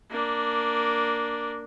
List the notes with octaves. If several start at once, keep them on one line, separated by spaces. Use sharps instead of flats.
A#3 D4